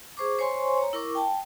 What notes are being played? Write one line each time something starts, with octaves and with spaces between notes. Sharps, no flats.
G#4 C5 C#6 D6
C5 C#5 G#5 C6 C#6
C#5 A#5
E4 A#4 C#6 D6
G5 A5